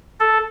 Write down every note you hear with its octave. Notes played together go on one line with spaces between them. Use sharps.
A4